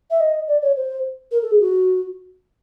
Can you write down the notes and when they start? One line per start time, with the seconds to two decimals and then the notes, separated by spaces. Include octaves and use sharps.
0.10 E5
0.20 D#5
0.47 D5
0.62 C#5
0.76 C5
1.31 A#4
1.41 A4
1.51 G#4
1.60 F#4